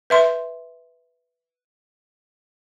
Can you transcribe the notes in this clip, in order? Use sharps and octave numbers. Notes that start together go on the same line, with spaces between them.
B4 E5 C6